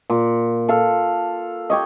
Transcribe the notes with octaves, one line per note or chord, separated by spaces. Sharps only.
A#2
A4 F5
G4 C#5 D#5